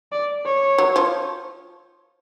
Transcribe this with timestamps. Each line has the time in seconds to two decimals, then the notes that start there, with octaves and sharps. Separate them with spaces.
0.12 D5
0.45 C#5
0.78 F#3
0.96 F3